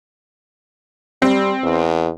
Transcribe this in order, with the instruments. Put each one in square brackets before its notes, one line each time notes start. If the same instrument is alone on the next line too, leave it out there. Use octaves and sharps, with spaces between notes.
[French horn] G3 [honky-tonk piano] C4
[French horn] E2